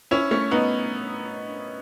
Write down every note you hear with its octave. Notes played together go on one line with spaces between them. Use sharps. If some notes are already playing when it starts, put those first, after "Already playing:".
C#4 E4
A3 C#4
B3 D#4